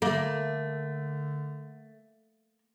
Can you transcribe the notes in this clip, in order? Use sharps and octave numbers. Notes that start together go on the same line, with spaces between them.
D3 A3 A#3